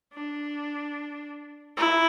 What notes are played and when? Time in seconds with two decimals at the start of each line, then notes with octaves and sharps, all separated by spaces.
0.14 D4
1.78 E4